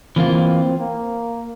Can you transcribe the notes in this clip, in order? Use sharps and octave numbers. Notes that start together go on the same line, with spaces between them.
E3 A#3 C4 F4
A#3